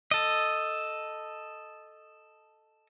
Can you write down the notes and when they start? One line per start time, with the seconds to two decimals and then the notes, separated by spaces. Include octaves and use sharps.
0.11 A4 D#5